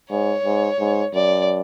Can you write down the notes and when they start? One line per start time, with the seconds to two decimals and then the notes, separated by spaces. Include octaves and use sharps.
0.11 G#2 C#5
0.45 G#2
0.80 G#2
1.14 F#2 D5